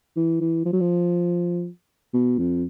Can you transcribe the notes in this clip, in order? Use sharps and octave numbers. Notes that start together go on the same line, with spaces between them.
E3
E3
F3
F#3
F3
B2
F2